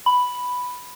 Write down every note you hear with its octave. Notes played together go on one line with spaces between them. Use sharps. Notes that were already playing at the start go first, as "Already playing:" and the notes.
B5